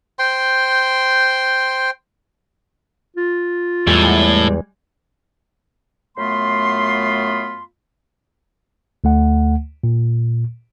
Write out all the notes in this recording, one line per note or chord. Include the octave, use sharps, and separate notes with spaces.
C5 G5 C6
F4
E2 A2 G3 G#3
F#2 A3 B3 F4 B5 C6
D2 A3 F#5
A#2